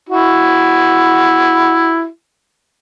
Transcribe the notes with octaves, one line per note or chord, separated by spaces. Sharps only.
E4 F#4